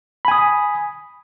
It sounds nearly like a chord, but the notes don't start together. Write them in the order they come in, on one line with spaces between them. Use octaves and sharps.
B5 G#5 D#6